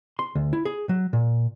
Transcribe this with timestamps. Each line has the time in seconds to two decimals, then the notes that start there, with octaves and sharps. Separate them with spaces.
0.19 C6
0.35 D2
0.53 E4
0.65 G#4
0.89 F#3
1.13 A#2